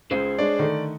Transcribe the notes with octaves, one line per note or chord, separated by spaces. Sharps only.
C#2 G#4 C5
G#3 D4 C#5 D5
D3 D#3 A3